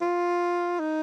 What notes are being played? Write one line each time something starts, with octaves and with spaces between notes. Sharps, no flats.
F4
D#4